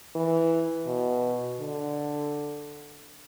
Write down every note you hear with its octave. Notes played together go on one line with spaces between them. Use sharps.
E3
B2
D3